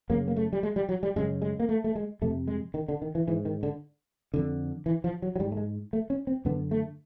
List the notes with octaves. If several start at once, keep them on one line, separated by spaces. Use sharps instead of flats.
F#2 C#3 A#3
A#3
A3
G3
G#3
G3
F#3
G3
F#2 C#3 G#3
G#3
A#3
A3
A3
G#3
F2 C3 A3
G#3
D#3
D3
D#3
E3
G#2 E3
D#3
D3
F2 D3
E3
F3
F#3
F#3
G#2 G3
A3
G#3
A3
C#4
C4
F#2 D3 B3
A3